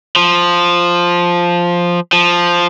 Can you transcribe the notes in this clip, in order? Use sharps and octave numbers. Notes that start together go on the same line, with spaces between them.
F3
F3